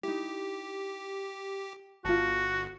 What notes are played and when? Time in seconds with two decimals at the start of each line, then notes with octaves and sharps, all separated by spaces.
0.03 D#4 E4 G4
2.05 G1 F4 F#4 A5